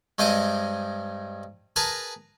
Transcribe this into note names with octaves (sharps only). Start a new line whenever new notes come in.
G2 G#3 C4 D#5 D6 D#6
G#4 A#4 B4 A5 A#5